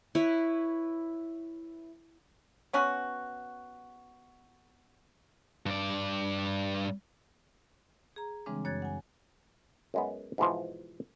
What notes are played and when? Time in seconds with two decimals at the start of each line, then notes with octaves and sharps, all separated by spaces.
0.15 E4 B4 C#5
2.73 B3 C#4 F#4
5.66 G2 D5
8.16 G#4 A#5
8.46 C#3 E3 G3 G#3 C4 D4
8.65 F#2 C#5 F#6 G#6 A6
8.82 F#5 G#5
9.94 F#2 G#3 B3
10.38 G#2 B2 E3 F3